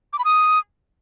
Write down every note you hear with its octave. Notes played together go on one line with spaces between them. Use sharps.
D6
B5
D#6